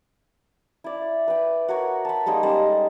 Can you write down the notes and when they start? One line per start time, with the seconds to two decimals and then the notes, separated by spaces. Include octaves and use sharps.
0.84 E4 D5
1.28 B4 G5
1.68 F#4 A#4 C#5 B5
2.05 A5 B5
2.26 G3 G#3 A#3 D#4
2.43 G3 G#3 C#4 A4